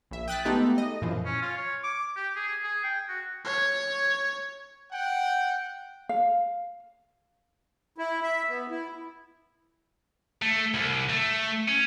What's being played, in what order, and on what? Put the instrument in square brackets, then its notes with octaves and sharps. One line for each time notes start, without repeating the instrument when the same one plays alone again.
[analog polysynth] A#1 E5
G5 D#6 F#6 A6 B6
G#3 A3 B3 D#4 G4 A4
D#5
F#2 A#2 E3 F3
[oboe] C#4
F4
C#5
D6
G4
G#4
G#4
G5
F#4
[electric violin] C#5
[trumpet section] F#5 G5
[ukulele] F5
[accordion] E4
E5
B3
E4
[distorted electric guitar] A3
C2
A3
C#4